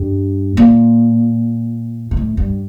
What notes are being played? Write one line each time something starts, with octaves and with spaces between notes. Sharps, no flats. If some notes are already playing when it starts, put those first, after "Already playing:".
Already playing: G2
A#2
A#2
A2
G2